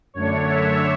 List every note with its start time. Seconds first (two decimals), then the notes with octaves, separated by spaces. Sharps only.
0.14 F#2 D3 A3 D4 C#5
0.44 E5